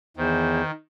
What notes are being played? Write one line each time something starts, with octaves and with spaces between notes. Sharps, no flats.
E2 D#3 C5